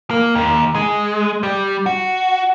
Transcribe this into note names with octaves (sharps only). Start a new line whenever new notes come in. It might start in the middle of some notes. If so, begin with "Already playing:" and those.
A#3
D#2
G#3
G3
F#4